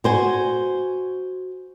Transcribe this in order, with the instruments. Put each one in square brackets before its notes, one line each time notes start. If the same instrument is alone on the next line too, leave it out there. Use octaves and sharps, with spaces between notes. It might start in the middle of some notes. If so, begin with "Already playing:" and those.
[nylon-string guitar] F#4 C5 G#5